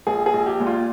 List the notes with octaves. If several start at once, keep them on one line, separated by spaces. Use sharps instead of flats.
A#1 G#4
G#4
A#1
G4
A#2
F4